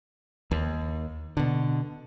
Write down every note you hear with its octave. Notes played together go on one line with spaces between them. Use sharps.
D#2
B2 D3